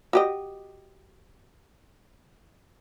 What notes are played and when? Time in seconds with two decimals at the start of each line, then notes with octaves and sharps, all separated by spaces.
0.13 F#4 G4 D#5